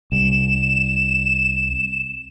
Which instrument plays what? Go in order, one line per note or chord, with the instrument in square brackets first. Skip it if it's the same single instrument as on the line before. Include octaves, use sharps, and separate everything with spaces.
[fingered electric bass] C2 [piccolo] E7